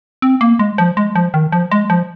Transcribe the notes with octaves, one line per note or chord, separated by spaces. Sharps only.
C4
A#3
G#3
F3
G#3
F3
D#3
F3
G#3
F3